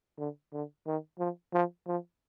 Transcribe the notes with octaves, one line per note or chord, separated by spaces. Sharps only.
D3
D3
D#3
F3
F3
F3